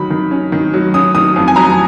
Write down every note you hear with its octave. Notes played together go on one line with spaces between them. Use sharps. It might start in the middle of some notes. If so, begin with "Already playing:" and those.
Already playing: D#3 F#3 B5
D#3
C#4
D#3
F#3
C#4 D#6
D#3 D#6
F2
G#5
F#3 A#5